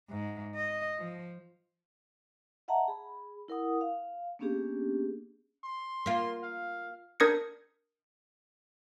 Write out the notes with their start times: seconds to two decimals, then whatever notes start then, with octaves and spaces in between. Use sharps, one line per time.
0.10 G#2
0.55 D#5
0.99 F3
2.68 D#5 E5 F#5 A5 A#5
2.88 G#4 B5
3.48 E4 A#4 F#5 D#6
3.81 F5
4.39 A#3 B3 C#4 D4 G4 G#4
5.64 C6
6.06 A#3 F4
6.43 F5
7.20 D4 A#4 D#6 G#6 A#6 C#7